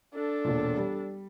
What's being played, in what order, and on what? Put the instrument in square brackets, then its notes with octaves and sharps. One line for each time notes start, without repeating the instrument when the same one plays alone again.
[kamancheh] D4 A4
[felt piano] E1 A#2
G3